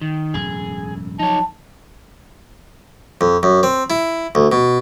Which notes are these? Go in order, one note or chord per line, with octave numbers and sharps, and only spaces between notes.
D#3
E1 F#2 A2 G#4
F3 F#3 D#4 C#5 A5
F2
F#2
C4
E4
D2
B2